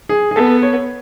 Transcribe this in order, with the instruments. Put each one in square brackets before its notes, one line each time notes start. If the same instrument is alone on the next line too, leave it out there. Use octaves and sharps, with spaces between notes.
[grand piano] G#4
G#4
[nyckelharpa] B3 [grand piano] A4
[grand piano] C#5